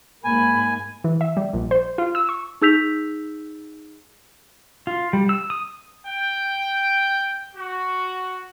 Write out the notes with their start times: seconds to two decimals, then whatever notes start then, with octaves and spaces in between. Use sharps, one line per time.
0.24 G#2 A#3 G#5 B5
1.04 E3
1.21 E5
1.37 G3
1.53 A#1
1.71 C5
1.98 F4
2.15 E6
2.29 C#6
2.61 D#4 G#4 E6 G6 B6 F7
4.87 F4
5.13 G3
5.29 E6
5.50 D#6
6.07 G5
7.56 F#4